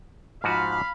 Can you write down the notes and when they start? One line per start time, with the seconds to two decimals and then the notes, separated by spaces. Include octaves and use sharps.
0.44 G#2 F3 F#4 F5 B5